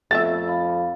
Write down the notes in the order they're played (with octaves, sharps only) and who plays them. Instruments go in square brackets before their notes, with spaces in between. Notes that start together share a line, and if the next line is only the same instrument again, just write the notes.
[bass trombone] F2 [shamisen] A3 B3 E5 [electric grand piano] A6
[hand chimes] F5 B5